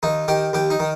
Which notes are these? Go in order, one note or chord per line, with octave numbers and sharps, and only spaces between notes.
D#2 D#4
D#3 G4
D#2 G4
D#4
D#3